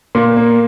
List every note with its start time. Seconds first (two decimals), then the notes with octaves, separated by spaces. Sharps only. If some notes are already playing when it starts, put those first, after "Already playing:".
0.15 A#2
0.37 A#3